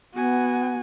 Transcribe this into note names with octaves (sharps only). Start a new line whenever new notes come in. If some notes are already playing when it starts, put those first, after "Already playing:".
B3 F#4 G#5